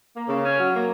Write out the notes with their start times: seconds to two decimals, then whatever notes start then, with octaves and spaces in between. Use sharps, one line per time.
0.14 A#3
0.29 C#3
0.44 C#4
0.59 F#3
0.73 A#3